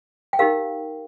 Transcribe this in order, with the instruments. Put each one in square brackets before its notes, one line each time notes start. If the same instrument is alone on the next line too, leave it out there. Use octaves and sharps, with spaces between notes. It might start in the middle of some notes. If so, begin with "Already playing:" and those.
[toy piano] G5
D#4 G4 A#4 F5